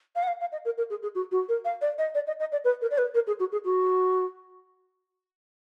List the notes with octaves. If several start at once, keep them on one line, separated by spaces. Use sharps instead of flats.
F5
F#5
F5
F5
D#5
A#4
A#4
G#4
G#4
F#4
F#4
A#4
F5
D5
D#5
D5
D#5
D#5
D5
B4
A#4
D5
B4
A#4
G#4
F#4
G#4
F#4